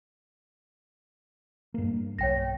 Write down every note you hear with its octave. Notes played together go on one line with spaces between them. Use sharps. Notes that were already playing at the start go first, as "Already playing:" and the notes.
G2 A#3
B1 C#5 G5 A#6